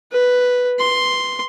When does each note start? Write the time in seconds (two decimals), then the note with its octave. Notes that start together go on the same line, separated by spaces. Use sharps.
0.12 B4
0.79 C6